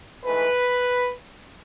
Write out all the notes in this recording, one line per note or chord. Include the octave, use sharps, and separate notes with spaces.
G#2 E3 A3 B4